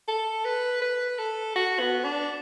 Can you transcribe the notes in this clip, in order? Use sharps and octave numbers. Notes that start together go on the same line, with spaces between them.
A4
B4
B4
A4
F#4
B3
D4